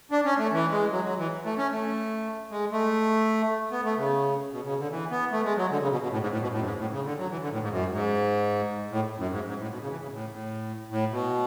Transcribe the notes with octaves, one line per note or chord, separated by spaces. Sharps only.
D4
C#4
A3
E3
G#3
F#3
F#3
E3
A3
C#4
A3
G#3
A3
B3
A3
C#3
B2
C#3
D3
E3
B3
A3
G#3
F#3
D3
C#3
B2
B2
A2
G#2
A2
B2
A2
F#2
G#2
A2
C#3
D3
F#3
E3
D3
A2
G#2
F#2
G#2
A2
F#2
G#2
G#2
A2
B2
C#3
E3
C#3
A2
A2
A2
B2